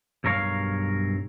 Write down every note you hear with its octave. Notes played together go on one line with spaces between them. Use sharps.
B1 G2 A#4 C#5 F5